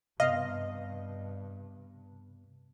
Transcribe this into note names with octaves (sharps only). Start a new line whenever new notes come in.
G2 C3 B3 D#5 F5